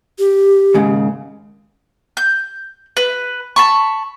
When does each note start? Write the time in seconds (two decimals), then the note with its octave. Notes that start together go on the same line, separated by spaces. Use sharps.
0.19 G4
0.74 D#2 G#2 C#3
2.17 G6
2.97 B4
3.56 A5 B5 C#6